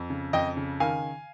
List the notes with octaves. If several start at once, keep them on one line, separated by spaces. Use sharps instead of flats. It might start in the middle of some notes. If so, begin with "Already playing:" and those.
Already playing: F2
C#3
F2 D#5 G5
C#3
D#3 F5 G#5